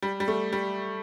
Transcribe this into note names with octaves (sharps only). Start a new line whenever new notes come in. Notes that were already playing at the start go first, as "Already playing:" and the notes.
G3
G3
A3
G3